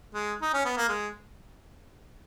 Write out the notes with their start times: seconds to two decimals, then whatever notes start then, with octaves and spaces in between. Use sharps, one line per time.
0.14 G#3
0.42 D#4
0.53 C#4
0.65 B3
0.77 A#3
0.89 G#3